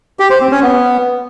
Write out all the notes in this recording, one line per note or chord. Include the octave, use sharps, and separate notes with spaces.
G4
C5
C4
C#4
B3